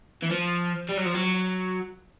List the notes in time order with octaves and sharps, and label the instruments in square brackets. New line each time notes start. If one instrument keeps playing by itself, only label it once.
[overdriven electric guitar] E3
F3
G3
F#3
F3
F#3